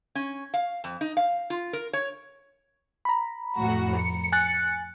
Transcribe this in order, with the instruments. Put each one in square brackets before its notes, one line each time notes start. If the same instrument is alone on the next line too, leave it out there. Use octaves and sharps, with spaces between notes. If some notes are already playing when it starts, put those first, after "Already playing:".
[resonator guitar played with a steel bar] C#4
F5
F2
D#4
F5
F4
A#4
C#5
[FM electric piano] A#5 B5
[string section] F2 A2 F#4
C#7
[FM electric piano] G#5 F#6 A6